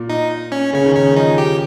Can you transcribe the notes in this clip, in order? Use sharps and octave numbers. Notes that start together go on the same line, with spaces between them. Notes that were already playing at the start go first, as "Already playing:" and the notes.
Already playing: A#2
D#4
C#4
C#3 C#4
D#3
C#3 C#4
F3 D#4
G4